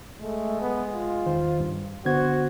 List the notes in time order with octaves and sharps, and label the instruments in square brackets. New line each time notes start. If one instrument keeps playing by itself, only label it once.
[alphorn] G#3 [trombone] A3
[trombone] B3
F4
[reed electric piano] E2 D#3 C5
G2
[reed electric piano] D3 B3 G#6 [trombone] F#4 [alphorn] C5